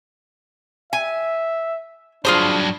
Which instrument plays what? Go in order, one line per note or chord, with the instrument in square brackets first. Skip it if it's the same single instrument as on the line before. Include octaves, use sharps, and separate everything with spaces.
[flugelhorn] E5 [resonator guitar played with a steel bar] G#5
[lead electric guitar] G2 F#3 [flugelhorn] D4 [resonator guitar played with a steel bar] F4 G#4 C5